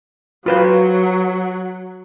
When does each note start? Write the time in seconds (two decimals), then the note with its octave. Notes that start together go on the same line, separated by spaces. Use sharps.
0.46 F#3 F4 B4 C5